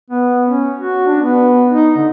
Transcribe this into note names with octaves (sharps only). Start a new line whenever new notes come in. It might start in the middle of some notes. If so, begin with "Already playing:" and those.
B3
C#4
F#4
D4
B3
D#4
D3